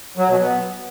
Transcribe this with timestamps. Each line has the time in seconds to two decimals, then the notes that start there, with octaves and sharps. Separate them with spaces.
0.17 F#3
0.29 B2
0.40 B3